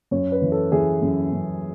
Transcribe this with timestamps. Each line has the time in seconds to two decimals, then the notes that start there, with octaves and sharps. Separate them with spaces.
0.11 F#2 C#5
0.32 B4
0.42 E3
0.52 A4
0.72 E3 G#4
1.02 F#2
1.33 F#2